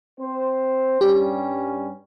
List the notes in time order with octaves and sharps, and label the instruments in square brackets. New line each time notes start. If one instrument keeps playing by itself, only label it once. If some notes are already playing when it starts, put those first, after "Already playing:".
[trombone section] C4 C5
[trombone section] G2 G3 C#4 [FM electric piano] G4